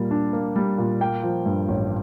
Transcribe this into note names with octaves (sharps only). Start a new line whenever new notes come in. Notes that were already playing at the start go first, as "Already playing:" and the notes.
Already playing: A#2 G3 A#3
D4
A#3
G3
A#2
A#3 G5
F3
G2
A1